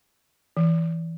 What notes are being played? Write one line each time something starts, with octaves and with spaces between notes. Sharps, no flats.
E3